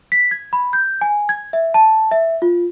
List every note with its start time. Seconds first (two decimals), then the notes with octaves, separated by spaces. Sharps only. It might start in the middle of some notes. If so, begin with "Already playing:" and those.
0.12 B6
0.31 G#6
0.53 B5
0.73 G6
1.01 G#5
1.29 G#6
1.53 E5
1.74 A5
2.11 E5
2.42 F4